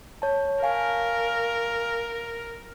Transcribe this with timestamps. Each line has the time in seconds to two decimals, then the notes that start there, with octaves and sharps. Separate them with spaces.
0.22 C#5 A5
0.63 A#4 F5 G#5 C#6